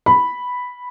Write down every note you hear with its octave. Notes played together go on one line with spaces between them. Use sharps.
B5